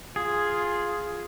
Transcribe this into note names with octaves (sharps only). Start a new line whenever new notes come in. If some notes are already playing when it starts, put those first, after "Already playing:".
F4 G#4